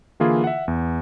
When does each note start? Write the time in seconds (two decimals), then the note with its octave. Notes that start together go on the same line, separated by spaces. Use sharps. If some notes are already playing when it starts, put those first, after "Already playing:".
0.20 D3 E3 A#3 E4 F4 G#4
0.44 E5 F#5
0.68 E2